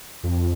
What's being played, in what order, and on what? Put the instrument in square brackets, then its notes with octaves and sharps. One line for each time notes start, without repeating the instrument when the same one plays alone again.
[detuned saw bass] F2